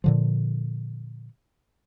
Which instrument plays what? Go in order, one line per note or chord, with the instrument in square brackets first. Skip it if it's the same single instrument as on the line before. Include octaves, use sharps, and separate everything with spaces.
[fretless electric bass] A#2 D3 F3